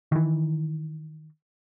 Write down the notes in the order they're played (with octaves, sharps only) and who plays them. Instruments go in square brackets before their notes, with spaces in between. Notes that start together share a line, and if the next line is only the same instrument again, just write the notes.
[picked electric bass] D#3 E3